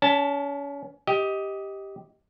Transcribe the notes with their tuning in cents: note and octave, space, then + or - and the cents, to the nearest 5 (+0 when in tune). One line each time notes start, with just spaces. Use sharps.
C#4 +30 A5 +0
G4 +0 D#5 +15